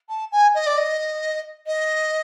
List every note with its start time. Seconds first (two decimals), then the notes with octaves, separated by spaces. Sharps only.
0.09 A5
0.32 G#5
0.54 D#5
0.66 D5
0.77 D#5
1.66 D#5